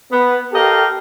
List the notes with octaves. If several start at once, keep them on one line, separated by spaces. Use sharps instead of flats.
B3
G4 A4 A#4 D#5 F5 G5